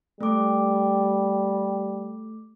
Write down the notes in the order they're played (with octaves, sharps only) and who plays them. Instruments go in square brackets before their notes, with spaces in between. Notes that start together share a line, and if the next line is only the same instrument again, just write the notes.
[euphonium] G3 [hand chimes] A3 D6